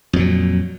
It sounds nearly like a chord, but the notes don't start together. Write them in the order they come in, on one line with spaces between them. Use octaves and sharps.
F2 F#3 A#2